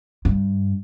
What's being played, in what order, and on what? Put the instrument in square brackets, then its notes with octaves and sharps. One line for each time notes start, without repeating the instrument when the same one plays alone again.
[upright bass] G2